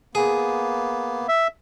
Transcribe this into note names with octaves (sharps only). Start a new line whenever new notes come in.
A#3 B3 G#4
E5